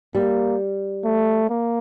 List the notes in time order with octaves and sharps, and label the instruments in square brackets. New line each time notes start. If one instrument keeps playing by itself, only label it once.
[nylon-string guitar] G3 [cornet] A#3
[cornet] A3
A#3